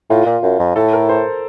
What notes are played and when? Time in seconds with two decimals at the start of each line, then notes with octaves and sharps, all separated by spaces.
0.10 A2 F4
0.26 A#2
0.43 F#2
0.59 F2
0.75 A2 A4
0.93 A#4
1.09 C5